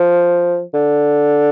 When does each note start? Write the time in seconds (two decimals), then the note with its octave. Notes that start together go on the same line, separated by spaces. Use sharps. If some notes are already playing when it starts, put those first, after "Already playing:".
Already playing: F3
0.74 D3